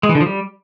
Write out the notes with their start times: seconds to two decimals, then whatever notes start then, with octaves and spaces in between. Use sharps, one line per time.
0.03 G#3
0.09 E3
0.15 D3
0.21 F3
0.26 G3